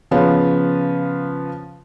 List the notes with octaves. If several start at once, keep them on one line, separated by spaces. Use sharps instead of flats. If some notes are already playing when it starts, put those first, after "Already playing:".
C#3 F3 B3 C#4